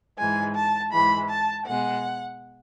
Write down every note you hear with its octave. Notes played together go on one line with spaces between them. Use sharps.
G#2 E3 G#3 G#5
A5
G#2 E3 G#3 B5
A5
B2 G#3 F#5